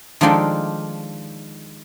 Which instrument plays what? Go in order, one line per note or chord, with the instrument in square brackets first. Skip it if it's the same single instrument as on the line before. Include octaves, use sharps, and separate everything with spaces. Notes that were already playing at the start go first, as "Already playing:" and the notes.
[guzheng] D#3 F3 G#3 D4 F4 A4